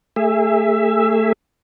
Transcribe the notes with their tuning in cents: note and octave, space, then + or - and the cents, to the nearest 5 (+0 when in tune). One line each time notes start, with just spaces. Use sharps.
A3 +15 G#4 -25 E5 +10